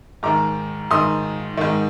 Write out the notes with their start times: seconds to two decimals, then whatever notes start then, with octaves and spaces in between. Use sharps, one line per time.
0.23 G#2 D#3 A#5 D6
0.91 G#2 D#3 C6 D#6
1.57 G#2 D#3